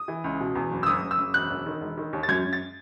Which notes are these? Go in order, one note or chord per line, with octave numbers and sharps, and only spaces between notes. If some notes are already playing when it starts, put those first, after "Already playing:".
Already playing: D#6
E3
C#2
B2
E2
F#1
E6
F#1 D#6
F#1
E6
F#1
E1 F#6
E1
D#3
E1
D#3
D#2
A6
F#2 G#6
F#2
A6